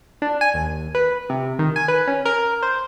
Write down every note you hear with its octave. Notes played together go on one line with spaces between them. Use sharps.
D4
G#5
D#2
B4
C3
D#3
G#5
B4
C#4
A#4
C5